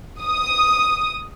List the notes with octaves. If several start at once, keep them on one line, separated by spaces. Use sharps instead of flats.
D#6